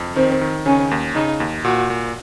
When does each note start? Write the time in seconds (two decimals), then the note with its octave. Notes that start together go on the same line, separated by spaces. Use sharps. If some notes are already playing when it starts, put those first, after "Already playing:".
Already playing: F2
0.16 D#3 C4
0.41 D#3
0.66 C#3 C#4
0.91 D#2
1.15 C#3 D#4
1.40 D#2
1.65 A#2 F#4
1.90 A#2